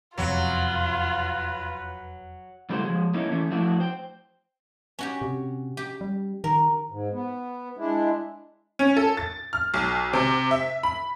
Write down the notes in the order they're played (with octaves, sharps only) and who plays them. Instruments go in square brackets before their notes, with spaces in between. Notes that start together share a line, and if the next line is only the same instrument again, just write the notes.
[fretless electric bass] E1 F2 C3 [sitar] F#3 [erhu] F4 [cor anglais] B4
[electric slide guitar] C#3 G3 A3 E4 F#4 C5
F3 G#3
A3 A#3 C#4 D#4 E4
E3 A3 C#4
F3 A3 D4 E4 F#4
C5 G5
[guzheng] C#4 F#4 G4
[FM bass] C3
[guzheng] G4
[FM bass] G3
[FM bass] D#3 [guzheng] A#4
[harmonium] G#2
B3
G#3 D4 E4
[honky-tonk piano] C#4
A4
A6
F6
B1
C3
E5
B5